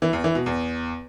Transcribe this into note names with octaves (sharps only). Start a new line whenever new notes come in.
E3
E2
E3
B2
E2